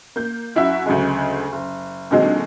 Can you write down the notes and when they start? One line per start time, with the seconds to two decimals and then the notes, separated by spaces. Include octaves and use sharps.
0.16 A#3 G6
0.56 F#2 E4 F#4 E5
0.86 D2 C#3 F#3 G#3
1.52 F#1
2.11 A#2 D3 F#3 G#3 C4 D#4